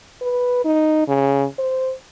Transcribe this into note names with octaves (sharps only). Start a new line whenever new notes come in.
B4
D#4
C#3
C5